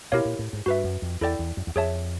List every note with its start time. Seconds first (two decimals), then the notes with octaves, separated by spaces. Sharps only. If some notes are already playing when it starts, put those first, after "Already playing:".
0.12 B2 E4 G4 A#4 C#5 F5
0.25 A#2
0.39 A2
0.53 G#2
0.66 G2 F#4 B4 E5
0.84 F#2
1.02 F2
1.21 E2 E4 A4 D5 G5
1.39 E2
1.57 F#2
1.67 E2
1.76 F2 G#4 C#5 E5 A5